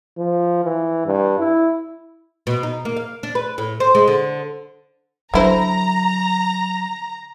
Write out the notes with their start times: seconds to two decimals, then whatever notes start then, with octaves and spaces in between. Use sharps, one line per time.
0.18 F3
0.64 E3
1.06 G2
1.39 E4
2.47 B2
2.63 D#4
2.85 A#3
2.96 F5
3.23 D4
3.35 B4
3.58 A2
3.80 C5
3.95 G#3
4.08 D3
5.34 D3 F#3 E4 C5 A#5